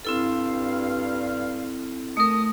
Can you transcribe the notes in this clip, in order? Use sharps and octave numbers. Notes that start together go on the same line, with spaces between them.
G2 C4 E4 A4 F5
A3 A#4 D#6